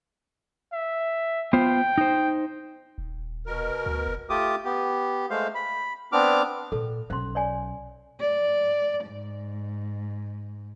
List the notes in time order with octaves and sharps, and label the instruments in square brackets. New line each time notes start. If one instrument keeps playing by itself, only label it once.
[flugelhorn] E5
[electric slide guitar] B3 F4 C5 [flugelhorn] G5
[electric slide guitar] D#4 C5
[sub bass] D#1
[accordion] B2 A#4
[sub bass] D2
F1
[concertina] A3 F4 G4 D6 D#6
B3 G4
G#3 A3 C5 F5
B5
B3 C4 D4 D6 F6
[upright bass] A#2 [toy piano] A4
[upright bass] B1 C#4 [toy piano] C5 C6
[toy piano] C#5 D5 G#5
[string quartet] D5
G#2